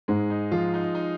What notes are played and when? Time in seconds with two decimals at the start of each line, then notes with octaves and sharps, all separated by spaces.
0.08 G#2 G#3
0.30 D#4
0.52 F3 F4
0.74 D#4
0.95 D#4